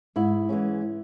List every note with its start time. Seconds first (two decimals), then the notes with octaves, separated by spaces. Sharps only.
0.16 G#2 E4
0.49 E3 G#3 C#4